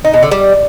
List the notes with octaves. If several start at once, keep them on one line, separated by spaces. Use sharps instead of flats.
D#4
B2
D3
G3